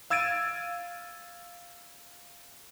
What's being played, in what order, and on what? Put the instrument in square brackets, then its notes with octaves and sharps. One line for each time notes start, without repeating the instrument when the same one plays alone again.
[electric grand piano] F5 E6 G#6 A6 D7 D#7